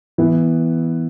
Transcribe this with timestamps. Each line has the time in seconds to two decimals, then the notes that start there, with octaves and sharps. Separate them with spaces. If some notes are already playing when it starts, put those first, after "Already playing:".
0.18 E3 B3 E4